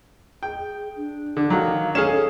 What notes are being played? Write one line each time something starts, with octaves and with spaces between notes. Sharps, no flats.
G#4 G5
D4
D3
D#3 F#3 F5
C#4 G#4 A4 F5 E7